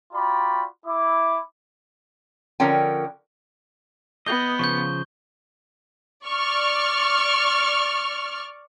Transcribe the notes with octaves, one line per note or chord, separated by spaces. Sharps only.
F4 F#4 D5 G5 A#5 B5
E4 D6
D3 F3 C#4 A#4 G5
B3 D#5 G6 G7
C#3 F3 C#6 G6
D5 C#6 F6